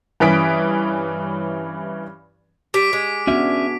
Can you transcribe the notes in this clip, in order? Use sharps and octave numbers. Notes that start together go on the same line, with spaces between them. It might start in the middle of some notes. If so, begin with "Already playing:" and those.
G2 E3 C#4 D#6 B6 D7
G3 D6 B6 D7
G#3
B3 C#4 D4 F#4 E5